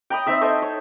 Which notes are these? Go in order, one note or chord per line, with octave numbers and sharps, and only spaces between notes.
G5 A#5 B5 D#6
C4 D#4 E5 E6
A4 C5 D#5 C#6
C#5